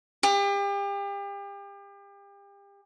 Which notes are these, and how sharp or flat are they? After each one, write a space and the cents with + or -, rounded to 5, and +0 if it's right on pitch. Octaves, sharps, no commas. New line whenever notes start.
G4 +35